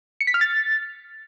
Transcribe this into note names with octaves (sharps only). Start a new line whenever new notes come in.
C#7
B6
F6
A6